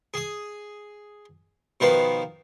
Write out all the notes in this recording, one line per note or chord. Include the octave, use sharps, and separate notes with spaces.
G#4 D#6
B2 D#3 F3 B4 F5